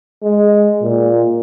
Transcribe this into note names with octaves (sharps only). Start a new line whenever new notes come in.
G#3
A#2